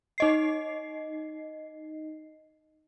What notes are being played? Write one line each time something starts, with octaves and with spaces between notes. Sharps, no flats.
D#4 D#5 C7